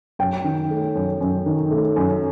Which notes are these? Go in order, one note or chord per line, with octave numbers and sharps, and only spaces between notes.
F#2 G5
D#3
A3
F#2
F#2
D#3
A3
F#2